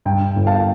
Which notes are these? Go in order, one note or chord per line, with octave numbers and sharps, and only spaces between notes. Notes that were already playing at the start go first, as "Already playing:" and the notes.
G2 G5
G1
F5 A5